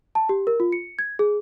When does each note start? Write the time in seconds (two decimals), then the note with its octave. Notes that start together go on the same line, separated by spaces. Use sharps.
0.15 A5
0.29 G4
0.47 A#4
0.60 F4
0.72 C#7
0.99 G#6
1.19 G#4